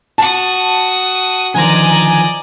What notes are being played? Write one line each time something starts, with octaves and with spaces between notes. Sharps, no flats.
F#4 A5 D#6
D3 D#3 F3 D5 D#5 G#5 A#5